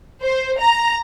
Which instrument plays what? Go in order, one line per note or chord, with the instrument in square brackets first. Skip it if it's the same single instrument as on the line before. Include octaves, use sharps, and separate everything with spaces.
[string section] C5
A#5